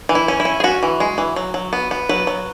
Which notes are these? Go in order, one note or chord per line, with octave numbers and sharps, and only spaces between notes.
E3
E4
C#4
E4
C#4
G#4
C#4 F#4
E3
G#3
E3
F#3
F#3
B3
B3
F#3 B4
F#3